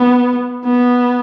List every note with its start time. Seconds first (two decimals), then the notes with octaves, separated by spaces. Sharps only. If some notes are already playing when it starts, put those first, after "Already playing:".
Already playing: B3
0.65 B3